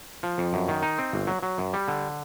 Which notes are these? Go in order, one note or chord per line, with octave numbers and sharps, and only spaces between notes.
F3
F2
F#2
D#3
D#4
C4
G1
F#3
F#3
F#2
G3
D3